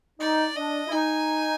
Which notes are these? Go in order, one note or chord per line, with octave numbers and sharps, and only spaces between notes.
D#4 D5
D4 D#5
E4
D#4 G#5